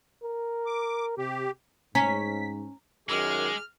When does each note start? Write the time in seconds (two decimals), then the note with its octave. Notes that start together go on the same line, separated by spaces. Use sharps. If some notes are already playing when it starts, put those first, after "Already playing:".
0.24 A#4
0.66 D6
1.18 C3 G4
1.95 G#2 C#4 A#5 B6
3.09 F#2 D#3 G#3 G#4 D6 F6